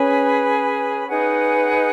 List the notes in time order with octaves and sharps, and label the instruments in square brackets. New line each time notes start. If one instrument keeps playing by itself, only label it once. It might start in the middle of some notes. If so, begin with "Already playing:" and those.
Already playing: [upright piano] C#4 [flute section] G#4 B4 G#5 B5
[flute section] D#4 G#4 B4 F#5